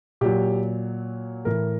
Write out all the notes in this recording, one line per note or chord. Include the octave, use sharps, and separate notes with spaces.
A#2 F#3 G4
A2 E3 A#4